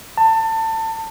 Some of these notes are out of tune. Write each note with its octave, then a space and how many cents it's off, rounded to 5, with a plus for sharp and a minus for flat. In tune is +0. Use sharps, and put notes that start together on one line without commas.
A5 +25